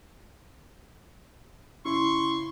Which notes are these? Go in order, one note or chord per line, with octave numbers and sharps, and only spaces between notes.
C#3 E4 C6 C#6